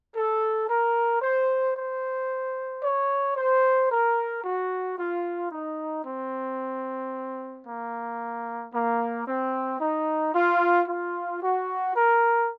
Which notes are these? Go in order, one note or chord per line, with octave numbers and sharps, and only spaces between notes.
A4
A#4
C5
C5
C#5
C5
A#4
F#4
F4
D#4
C4
A#3
A#3
C4
D#4
F4
F4
F#4
A#4